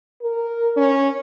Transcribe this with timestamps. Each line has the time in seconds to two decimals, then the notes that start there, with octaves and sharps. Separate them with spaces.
0.22 A#4
0.77 C#4